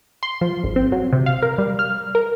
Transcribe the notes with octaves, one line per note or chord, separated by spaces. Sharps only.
C6
F3
G#1
C4
F#3
C3
F5
A#4
G3
F6
A#4